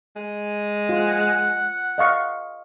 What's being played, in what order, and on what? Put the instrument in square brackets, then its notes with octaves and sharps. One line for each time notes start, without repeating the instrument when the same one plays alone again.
[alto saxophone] G#3
[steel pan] F4 [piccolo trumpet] F#5
[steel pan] D#5 F5 C#6